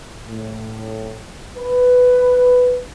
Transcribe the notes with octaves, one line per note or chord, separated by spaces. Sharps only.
A2
B4